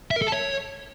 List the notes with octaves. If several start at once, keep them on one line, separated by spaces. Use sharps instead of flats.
E5
A#4
A4
A5
C#5